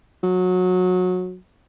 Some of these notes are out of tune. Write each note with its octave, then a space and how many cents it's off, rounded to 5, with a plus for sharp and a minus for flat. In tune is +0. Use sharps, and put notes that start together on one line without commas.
F#3 -20